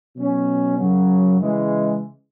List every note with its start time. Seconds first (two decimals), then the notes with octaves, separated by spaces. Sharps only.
0.16 B2 F#3 C#4
0.78 F#2 C#3 F#3
1.40 C#3 E3 G#3